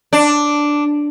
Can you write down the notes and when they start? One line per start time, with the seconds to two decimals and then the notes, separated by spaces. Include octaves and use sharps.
0.13 D4